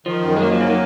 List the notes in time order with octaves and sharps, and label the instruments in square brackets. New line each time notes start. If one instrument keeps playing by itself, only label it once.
[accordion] D#3 [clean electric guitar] F3
[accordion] F#2
[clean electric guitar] G#3
[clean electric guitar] F#3 [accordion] A#3
[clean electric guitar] F3
[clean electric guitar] C#3 [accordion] F#3
[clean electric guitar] D#3